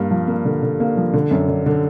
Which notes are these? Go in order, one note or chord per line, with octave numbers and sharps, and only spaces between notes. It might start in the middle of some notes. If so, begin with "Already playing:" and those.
Already playing: G2 A#3
F3
A#3
D3
D3
A#3
F3
D3
F#2
D3
D3